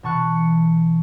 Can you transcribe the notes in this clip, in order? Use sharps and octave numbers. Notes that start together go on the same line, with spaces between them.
B2 E3 A5 C#6 F#6
C#7